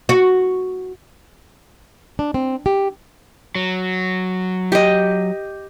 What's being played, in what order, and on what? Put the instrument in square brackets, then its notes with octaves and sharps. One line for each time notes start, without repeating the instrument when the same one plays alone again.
[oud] F#4
[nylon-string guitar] D4
C4
G4
[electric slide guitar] F#3
[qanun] G4 D#5